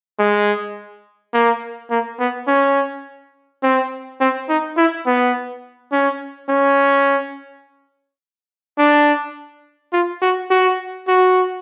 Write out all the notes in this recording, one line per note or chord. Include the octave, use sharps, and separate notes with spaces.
G#3
A#3
A#3
B3
C#4
C4
C4
D#4
E4
B3
C#4
C#4
D4
F4
F#4
F#4
F#4